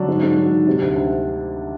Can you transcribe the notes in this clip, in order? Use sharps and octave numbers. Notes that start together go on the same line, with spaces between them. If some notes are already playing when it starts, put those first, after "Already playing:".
Already playing: D3 F#3 D4
G#2
G#2
F#3
D#3
C3
D2
D2